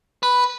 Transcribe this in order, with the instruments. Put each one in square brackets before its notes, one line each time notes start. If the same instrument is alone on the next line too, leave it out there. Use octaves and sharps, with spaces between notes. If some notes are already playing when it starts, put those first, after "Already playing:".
[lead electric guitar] B4